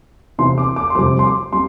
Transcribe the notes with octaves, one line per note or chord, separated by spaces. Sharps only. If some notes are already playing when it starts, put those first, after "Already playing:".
C3 E3 B3 E4 C6
D6
D6
C6
F2 C3 G3 D6
C6
D6
G3 C6